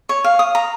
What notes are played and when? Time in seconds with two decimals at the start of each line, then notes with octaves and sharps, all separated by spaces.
0.09 C#5
0.24 F5
0.39 D#6
0.55 A#5